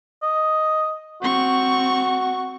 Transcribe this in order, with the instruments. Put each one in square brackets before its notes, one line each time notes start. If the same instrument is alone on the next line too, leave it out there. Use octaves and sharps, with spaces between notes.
[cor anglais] D#5
[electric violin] C4 C#6 [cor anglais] F#4